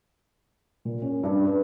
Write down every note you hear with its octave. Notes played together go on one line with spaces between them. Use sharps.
A#2
C#4
G2
B4